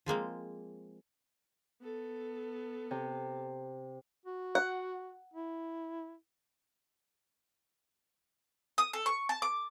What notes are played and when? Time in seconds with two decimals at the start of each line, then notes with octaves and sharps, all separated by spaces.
0.06 F3 G#3 A#3 C4
1.82 B3 A4
2.91 C3
4.26 F#4
4.55 F#5
5.34 E4
8.78 D#6
8.93 A4
9.06 C#6
9.29 A5
9.42 D6